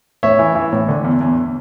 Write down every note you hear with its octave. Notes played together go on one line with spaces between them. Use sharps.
A2 C#5 E5
E3
E3
A2
D3
E2
E2